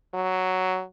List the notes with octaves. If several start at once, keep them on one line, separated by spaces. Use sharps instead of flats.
F#3